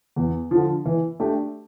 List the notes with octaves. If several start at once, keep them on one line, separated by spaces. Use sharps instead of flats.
E2
D3 F3
E3
A3 D4 G4